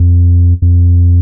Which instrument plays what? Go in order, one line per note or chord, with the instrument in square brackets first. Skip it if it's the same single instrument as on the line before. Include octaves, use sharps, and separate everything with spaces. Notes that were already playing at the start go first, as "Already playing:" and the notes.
Already playing: [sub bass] F2
F2